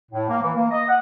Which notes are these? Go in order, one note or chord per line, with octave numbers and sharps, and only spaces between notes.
A2
A#3
E3
A#3
D#5
F#5